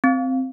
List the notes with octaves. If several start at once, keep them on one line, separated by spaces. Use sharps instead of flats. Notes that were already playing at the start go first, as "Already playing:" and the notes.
C4